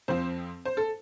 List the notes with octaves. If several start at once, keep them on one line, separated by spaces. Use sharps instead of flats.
F2 F3 C4 C5
C5
A4